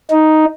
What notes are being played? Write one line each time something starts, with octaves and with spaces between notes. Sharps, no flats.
D#4